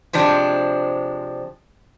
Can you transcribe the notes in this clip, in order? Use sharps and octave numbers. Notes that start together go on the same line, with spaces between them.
C3 F3 G#3 D4